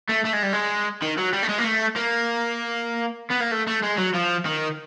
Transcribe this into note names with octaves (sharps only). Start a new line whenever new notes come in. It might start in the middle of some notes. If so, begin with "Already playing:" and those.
A3
A3
G#3
G3
G#3
D#3
F#3
G3
A3
G#3
A#3
A3
A#3
B3
A#3
A3
A3
G#3
F#3
F3
D#3